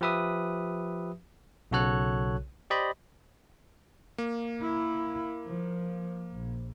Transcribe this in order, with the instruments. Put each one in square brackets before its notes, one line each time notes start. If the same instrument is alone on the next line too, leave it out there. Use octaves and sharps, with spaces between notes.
[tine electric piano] F3 G4 B4 E5 D#6
B1 C#3 F#4 A4 C#5 F#6
G4 C5 D5 D#5 B5
[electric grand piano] A#3
[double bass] E4
F3
A#1